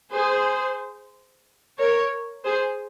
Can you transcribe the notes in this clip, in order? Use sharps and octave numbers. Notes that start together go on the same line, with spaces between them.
G#4 C5
A#4 C#5
G#4 C5